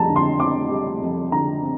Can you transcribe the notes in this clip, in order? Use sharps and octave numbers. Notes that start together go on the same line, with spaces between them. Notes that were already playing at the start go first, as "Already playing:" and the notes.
Already playing: F2 G3 A5 A#5
D3
C6
C4 D6
G3
F2
D3 A#5
C4